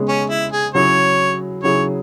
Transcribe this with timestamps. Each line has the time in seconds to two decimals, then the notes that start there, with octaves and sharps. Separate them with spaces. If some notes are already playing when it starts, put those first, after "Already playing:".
Already playing: C#3 G#3 B3 G#4 C#5
0.08 C#4
0.30 E4
0.52 G#4
0.74 C#3 F#3 E4 G#4 C#5
1.63 C#3 F#3 E4 G#4 C#5